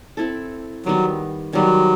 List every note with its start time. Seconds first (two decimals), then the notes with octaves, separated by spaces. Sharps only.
0.17 C4 E4 A4
0.85 D#3 F#3 G3 B3
1.53 D#3 F#3 G3 B3